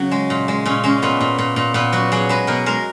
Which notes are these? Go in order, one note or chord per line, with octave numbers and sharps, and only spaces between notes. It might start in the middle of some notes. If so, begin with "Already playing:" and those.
Already playing: C#3 F#3
G#3
A#2
G#3
A#2 C#4
G#3 C#4
A#2 B3
A#2
A#2
A#2
A#2 B3
F#3 F#4
F#3 G#4
G#3 B4
B2 A#4
G#3 A#4